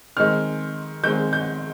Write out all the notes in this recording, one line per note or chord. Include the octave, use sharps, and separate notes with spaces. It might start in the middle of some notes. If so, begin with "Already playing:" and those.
D#3 G#3 C4 F6
D#3 G#3 C4 G6
G6